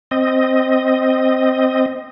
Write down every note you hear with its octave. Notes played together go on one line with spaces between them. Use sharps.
C4 D#5